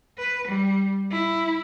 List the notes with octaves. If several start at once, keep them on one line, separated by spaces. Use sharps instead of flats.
B4
G3
E4